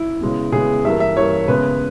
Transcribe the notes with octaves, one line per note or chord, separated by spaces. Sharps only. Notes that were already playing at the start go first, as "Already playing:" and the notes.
Already playing: E4
C#3 G#3 B3
C#3 G#3 B3 G#4
G2 E3 A#3 E5
E5
G2 E3 A#3 C#5
C#3 G#3 B3 B4